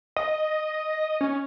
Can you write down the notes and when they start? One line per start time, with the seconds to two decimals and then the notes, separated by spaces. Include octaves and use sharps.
0.17 D#5
1.21 C#4